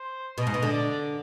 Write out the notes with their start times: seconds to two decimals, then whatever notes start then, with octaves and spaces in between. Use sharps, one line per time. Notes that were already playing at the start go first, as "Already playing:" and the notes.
Already playing: C5
0.38 B2 D#5
0.47 G#2
0.54 B2
0.63 D3
0.71 D5